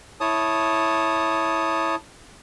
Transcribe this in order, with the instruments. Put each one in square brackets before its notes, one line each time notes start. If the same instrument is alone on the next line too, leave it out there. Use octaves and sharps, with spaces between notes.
[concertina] E4 C#5 A5 D#6